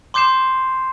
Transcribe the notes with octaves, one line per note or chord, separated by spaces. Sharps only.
C6 D6 G6 C7 E7